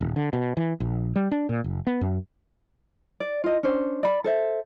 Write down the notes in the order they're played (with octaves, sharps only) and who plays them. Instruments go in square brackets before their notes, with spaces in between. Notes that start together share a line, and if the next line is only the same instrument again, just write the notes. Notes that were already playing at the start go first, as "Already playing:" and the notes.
[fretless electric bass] D#1
D3
B2
E3
A#1
G3
D4
A#2
F#1
B3
F#2
[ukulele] D5
F4 D#5
C#4 D4 C5
D5 B5
A4 C5 E5